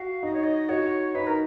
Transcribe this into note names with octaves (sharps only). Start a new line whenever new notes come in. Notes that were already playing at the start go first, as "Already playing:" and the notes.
Already playing: F#4 F5
D#4 D#5
C#5
D#5
F#4 C#5
D#4 B4
A#4